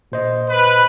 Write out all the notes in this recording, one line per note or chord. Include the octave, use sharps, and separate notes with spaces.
A#2 C5 D#5
B4